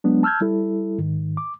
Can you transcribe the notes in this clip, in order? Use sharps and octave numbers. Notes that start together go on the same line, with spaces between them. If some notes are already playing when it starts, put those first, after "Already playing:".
F#3 G#3 B3 D4
A5 E6 F6 G6 G#6
G3 E4 A4
G#2 D#3
D6